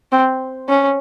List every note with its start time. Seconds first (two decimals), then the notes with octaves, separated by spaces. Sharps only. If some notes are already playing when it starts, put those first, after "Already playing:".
0.12 C4
0.69 C#4